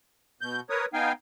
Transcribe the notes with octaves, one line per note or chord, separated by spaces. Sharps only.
B2 G6
A#4 B4 C#5 D#6
B3 D#4 F5 G5 G#5